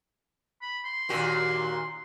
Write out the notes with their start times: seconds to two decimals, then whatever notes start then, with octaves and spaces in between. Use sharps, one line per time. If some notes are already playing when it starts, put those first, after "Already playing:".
0.62 B5
0.85 C6
1.09 D#2 A#2 F#4